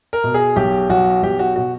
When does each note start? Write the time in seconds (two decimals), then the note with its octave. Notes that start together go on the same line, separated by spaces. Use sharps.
0.13 A#4
0.24 B2
0.34 G#4
0.56 B1 G4
0.90 B1 F#4
1.23 B1 G4
1.39 F#4
1.56 B2 F#4